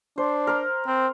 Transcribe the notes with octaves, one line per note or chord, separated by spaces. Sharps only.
D4 C5
A#4 C6
C4